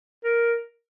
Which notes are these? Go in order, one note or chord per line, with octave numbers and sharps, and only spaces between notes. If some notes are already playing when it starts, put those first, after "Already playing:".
A#4